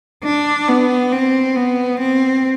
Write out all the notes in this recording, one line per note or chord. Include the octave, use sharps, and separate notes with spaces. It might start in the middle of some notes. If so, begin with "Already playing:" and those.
D4
B3
C4
B3
C4